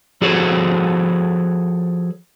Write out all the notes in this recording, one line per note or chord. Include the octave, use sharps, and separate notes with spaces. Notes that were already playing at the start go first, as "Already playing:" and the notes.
F3 F#4 G#4 A4 C5 C#5